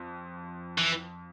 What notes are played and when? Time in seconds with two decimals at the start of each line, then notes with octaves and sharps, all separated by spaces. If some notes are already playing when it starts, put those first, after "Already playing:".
Already playing: F2 C4
0.78 E3